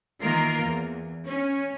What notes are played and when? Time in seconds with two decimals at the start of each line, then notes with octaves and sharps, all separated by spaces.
0.21 D#3 E3 A#3 F4 A#4
0.64 E2
1.26 C#4